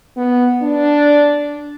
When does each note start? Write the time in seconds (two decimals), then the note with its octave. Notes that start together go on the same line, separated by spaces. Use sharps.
0.17 B3
0.62 D4